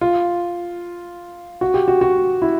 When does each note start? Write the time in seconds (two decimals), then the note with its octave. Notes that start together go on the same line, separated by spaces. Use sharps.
0.01 F4
1.61 F#4
1.74 G4
1.88 F#4
2.01 F#4
2.42 E4